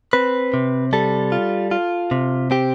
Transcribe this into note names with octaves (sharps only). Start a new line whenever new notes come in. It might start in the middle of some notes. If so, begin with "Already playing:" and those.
C4 B4
C3
G3 A4
F4
F4
C3
C4 G4